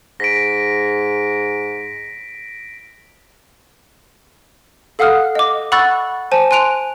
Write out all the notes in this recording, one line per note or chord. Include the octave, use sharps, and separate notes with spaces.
G#2 A#6 B6 D7
A4 F5 F#5 D#6 F6 F#6
D#5 D6
F#5 B5 C#6 E6 F#6 A6
C5 G#5 A5
G#5 C6 F#6 D7 F7